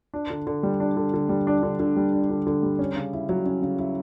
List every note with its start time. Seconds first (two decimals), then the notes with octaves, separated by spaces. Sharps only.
0.14 D4
0.30 D3
0.47 D3
0.63 G3
0.80 D4
0.97 D3
1.14 D3
1.29 G3
1.47 D4
1.63 D3
1.80 D3
1.96 G3
2.13 D4
2.30 D3
2.47 D3
2.63 G3
2.79 C#4
2.96 C#3
3.13 E4
3.29 F#3
3.46 C#4
3.62 C#3
3.79 E4